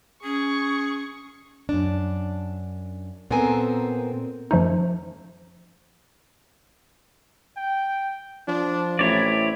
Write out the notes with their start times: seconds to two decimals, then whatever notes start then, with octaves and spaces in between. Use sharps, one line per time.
0.24 C#4 G#4 C#6
1.69 F#2 D4
3.30 A#2 B3 C4 A4 A#4 G#5
4.51 F#2 F3 A3 D#4
7.57 G5
8.48 F3 D4
8.99 A1 C4 E4 C#5 D5